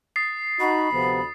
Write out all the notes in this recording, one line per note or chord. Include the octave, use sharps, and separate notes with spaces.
D#6 A6 C7
D#4 F#4 B5
D2 C3 F3 B3